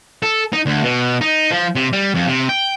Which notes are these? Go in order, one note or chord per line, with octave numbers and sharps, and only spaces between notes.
A4
D#4
D2
B2
D#4
F3
C3
G3
F2
C3
G5